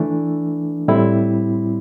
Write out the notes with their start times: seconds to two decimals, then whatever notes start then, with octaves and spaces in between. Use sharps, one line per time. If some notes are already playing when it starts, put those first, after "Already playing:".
Already playing: E3 A3 D4
0.88 A2 G3 C4 E4